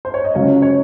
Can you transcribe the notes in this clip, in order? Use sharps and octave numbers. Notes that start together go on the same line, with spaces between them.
C5
C#5
D#5
C#2 C#3 F#3 C#5 F5
C#5